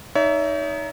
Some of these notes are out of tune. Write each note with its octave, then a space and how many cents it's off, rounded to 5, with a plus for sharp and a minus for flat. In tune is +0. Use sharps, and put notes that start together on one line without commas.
D#4 +0 C#5 +40 E5 +0